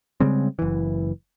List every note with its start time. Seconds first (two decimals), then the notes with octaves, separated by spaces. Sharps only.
0.20 C#3 G3 G#3 C4
0.59 F#1 E3